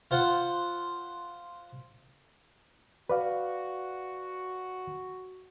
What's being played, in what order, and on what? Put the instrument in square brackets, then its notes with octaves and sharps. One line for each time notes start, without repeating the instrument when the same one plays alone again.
[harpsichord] F4 C5 F#5
[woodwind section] F#4 [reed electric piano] B4 D5 F5